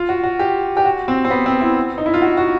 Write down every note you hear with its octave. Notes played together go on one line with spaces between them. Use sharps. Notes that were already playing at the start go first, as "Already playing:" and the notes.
Already playing: F4
F#4
F#4
G4
G4
F#4
C4
C4
B3
C4
E4
D#4
E4
F4
F#4
F#4